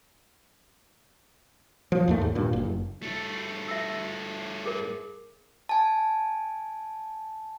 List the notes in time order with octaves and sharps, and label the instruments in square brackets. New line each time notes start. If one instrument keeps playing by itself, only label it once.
[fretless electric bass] F3
D#2 G#2 A3
D#2
G2 A#2
F#1
[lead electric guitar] G2 A3
[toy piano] E5 E6
G#4 A#4
[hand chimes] G#5 A5